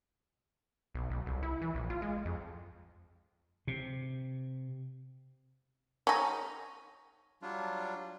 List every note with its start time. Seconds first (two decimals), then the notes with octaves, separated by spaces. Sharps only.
0.94 B1
1.10 B1
1.26 C2
1.43 E4
1.62 E3
1.75 A#1
1.90 F4
2.02 G#3
2.25 F2
3.67 C3
6.07 C#4 D#4
7.42 F#3 G3 D4 F4